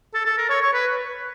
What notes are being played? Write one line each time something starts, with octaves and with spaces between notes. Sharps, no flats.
A4
A4
A#4
C#5
C#5
B4